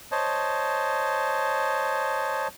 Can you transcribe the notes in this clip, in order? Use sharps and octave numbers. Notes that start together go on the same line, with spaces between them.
C5 C#5 D#5 A5